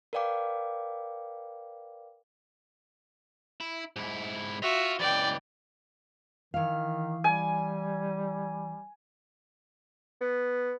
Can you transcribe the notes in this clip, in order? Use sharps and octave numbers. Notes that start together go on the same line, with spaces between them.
A#4 B4 D5 F5 G5 D6
E4
G#2 E4
F4 F#4 E5
C#2 E3 D5 G5
D#3 E3 F5
G3 G#5
B3